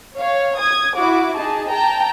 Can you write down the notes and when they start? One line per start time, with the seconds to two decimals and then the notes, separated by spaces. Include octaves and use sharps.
0.17 C#5 F5
0.57 D#6 G#6
0.95 E4 F#4 D6
1.35 D#4 G#4 A5
1.70 G5 A5 A#5